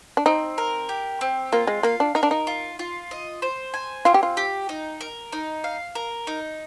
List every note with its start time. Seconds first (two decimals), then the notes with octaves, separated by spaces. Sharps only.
0.17 D4
0.26 C4 D#4
0.58 A#4
0.89 G4
1.21 C4
1.52 A#3 F4
1.67 G#3
1.83 A#3 F5
2.00 D4
2.15 D#4 A#4
2.23 D4
2.31 D#4
2.47 F4
2.79 F4
3.11 D#5
3.42 C5
3.74 G#5
4.05 C4 F4
4.14 G4
4.23 F4
4.37 G4
4.69 D#4
5.01 A#4
5.32 D#4
5.64 F5
5.95 A#4
6.27 D#4